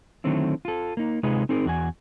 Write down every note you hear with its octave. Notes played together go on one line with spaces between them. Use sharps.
D3 D#3 F#3 A3 C4 E4
F4 A4
A#3 D#4
C3 G#3 D#4 F4 G#4 B4
C4 D#4 G#4 A#4
E2 F#4 G#5